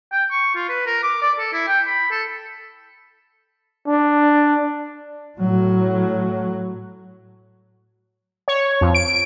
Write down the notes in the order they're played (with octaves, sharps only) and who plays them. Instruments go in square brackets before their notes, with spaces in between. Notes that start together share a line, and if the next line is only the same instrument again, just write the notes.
[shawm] G5
C#6
F4
B4
A#4
D6
D5
A4
E4
G5
B5
A4
[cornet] D4
[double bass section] A2 F#3
[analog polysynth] C#5
F2
D7